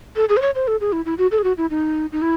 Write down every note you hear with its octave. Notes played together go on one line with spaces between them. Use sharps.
A4
G#4
C5
C#5
C5
A4
G#4
E4
E4
F#4
A4
G#4
F#4
E4
D#4
D#4
E4